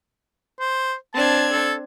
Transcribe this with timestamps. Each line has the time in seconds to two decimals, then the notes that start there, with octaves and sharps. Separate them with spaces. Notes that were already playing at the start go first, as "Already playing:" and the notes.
0.60 C5
1.14 C4 D4 A5 G#6
1.52 A4